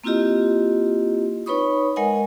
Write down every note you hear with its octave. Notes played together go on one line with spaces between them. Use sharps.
A#3 C4 E4 F4 G4 D#5
D#4 B4 C#5 B5 C#6 D#6
G#3 A#4 D#5 F#5 G#5